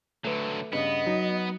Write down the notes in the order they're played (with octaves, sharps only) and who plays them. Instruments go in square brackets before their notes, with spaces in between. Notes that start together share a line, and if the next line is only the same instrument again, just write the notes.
[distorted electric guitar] D3 F#3 [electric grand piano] A3 B4
[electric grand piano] G2 C#3 [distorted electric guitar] B3 [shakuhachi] D#5
[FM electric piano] F#3 [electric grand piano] D#4